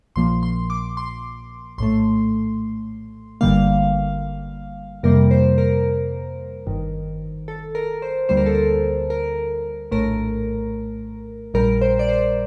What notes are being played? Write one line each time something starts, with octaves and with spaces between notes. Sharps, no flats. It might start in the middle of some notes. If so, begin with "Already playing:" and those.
A#1 A#2 F3 A#3 C6
C6
D6
C6
A#1 A2 A3 C6
G1 G2 D3 G3 A#3 F5
F2 C3 G3 A#3 A#4
C5
A#4
G1 G2 D#3
A4
A#4
C5
D2 D3 G3 A#3 C5
A#4
A4
A#4
A#4
A#1 A2 A3 A#4
A#1 A#2 G3 A#4
C5
D5
C5